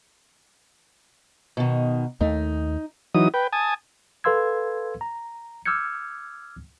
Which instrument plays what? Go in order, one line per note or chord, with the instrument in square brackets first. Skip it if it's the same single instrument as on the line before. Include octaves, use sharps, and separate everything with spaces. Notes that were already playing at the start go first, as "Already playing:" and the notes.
[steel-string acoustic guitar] B2 D#3
[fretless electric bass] D#2 A3 [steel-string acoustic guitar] D#4
[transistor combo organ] E3 F#3 D#4 D#6
B4 G5
G#5 A5 D#6
[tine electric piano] A4 B4 F5 C6 E6 G#6
A#5
D6 E6 F6 G6 G#6 C#7